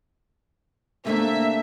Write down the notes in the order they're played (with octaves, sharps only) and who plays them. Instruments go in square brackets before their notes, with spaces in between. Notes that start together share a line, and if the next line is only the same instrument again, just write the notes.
[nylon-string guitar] C3 A3 D4 [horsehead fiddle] A#3 [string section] E5